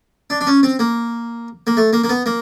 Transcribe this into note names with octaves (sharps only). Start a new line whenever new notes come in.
D4
D4
C#4
C4
A#3
A#3
A3
A#3
A#3
B3
A#3